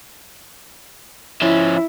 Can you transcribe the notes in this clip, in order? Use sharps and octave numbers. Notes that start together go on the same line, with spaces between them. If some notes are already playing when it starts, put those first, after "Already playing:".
F3 C#4 E4